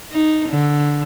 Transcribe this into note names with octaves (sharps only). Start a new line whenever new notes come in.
D#4
D3